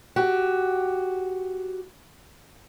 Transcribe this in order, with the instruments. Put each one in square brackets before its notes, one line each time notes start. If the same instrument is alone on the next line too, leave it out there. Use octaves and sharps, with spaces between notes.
[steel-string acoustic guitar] F#4 G4